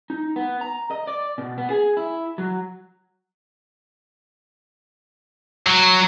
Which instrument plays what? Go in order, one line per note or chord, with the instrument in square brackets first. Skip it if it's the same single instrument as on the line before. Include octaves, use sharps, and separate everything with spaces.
[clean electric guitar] D#4
B3
A#5
D#5
D5
B2
B3
G#4
E4
F#3
[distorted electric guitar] F#3